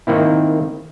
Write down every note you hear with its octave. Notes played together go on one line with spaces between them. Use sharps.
D#3 A#3 C4 E4